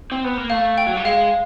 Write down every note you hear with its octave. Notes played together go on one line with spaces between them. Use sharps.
C4
B3
A#3
A3 F5
G5
F#3
G3
G#3 F5